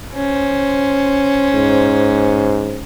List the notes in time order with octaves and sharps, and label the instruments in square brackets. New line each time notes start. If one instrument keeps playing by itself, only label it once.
[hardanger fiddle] C#4 C5
[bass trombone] G#2